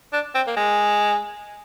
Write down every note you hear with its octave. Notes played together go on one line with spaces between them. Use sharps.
D4
C4
A#3
G#3